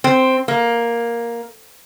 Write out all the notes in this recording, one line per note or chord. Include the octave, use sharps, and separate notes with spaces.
C4
A#3